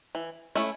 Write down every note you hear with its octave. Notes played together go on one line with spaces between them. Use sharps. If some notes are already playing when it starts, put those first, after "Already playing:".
E3
A3 C#4 E4